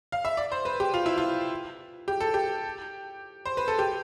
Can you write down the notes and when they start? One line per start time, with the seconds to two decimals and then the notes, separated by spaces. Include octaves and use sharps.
0.12 F5
0.25 E5
0.37 D5
0.52 C5
0.65 B4
0.80 G4
0.94 F4
1.06 E4
1.18 F4
2.08 G4
2.20 A4
2.34 G4
3.45 C5
3.57 B4
3.68 A4
3.79 G4